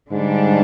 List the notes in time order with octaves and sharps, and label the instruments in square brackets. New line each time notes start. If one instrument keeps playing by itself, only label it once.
[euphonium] G#2 [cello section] D3 G3 D4